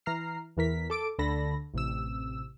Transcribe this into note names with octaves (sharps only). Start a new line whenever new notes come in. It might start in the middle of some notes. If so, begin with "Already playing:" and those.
E3 A#5 F6 C7
E2 E3 A#4 B6
A4 D6 D7
D2 D3 A4 B5 A#6
A1 C3 E6